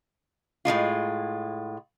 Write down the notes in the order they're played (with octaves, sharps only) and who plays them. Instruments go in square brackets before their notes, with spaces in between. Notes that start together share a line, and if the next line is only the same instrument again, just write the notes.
[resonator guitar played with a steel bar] A2 C3 G#3 F4